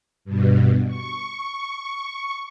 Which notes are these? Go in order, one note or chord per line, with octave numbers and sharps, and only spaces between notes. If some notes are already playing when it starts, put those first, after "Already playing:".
G2 B2
C#6